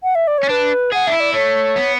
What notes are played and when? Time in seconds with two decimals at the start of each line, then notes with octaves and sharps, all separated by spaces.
0.03 F#5
0.15 E5
0.27 D5
0.38 C#5
0.43 C#4
0.49 D4 B4
0.92 G#4 F#5
1.07 D4 E5
1.13 E4
1.20 D5
1.34 A3 C#5
1.76 B3